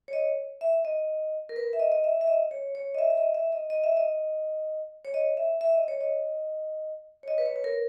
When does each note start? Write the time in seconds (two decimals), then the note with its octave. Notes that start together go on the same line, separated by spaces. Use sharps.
0.08 C#5
0.13 D#5
0.61 E5
0.85 D#5
1.49 A#4
1.56 B4
1.73 E5
1.80 D#5
1.92 D#5
2.04 E5
2.21 E5
2.27 D#5
2.51 C#5
2.75 C#5
2.95 D#5
2.99 E5
3.10 E5
3.17 D#5
3.34 E5
3.52 D#5
3.70 D#5
3.84 E5
3.97 D#5
5.05 C#5
5.14 D#5
5.37 E5
5.61 E5
5.75 D#5
5.88 C#5
6.01 D#5
7.23 C#5
7.28 D#5
7.38 B4
7.46 C#5
7.56 B4
7.64 A#4